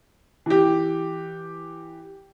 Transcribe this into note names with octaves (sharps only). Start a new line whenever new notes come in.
E3 G4